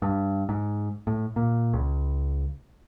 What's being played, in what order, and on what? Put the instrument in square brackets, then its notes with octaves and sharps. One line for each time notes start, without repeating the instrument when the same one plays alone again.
[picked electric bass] G2
G#2
A2
A#2
C#2